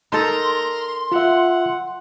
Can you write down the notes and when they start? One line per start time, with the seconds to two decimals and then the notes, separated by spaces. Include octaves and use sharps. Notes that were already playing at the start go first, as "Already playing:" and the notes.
0.12 D#4 A4 A#4 A#5 C6
1.12 F4 E5 F#5